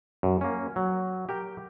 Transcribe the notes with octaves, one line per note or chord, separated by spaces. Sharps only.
F#2
A#3 C#4
F#3
G4 A#4 G5